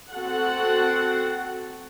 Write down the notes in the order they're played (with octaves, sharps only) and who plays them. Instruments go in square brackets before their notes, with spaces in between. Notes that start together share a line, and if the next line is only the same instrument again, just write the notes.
[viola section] C4 F#4 A4 F#5